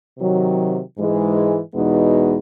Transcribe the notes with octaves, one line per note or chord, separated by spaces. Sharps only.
C3 D#3 F#3
G#2 E3 G#3
E2 B2 G#3 B3 D#4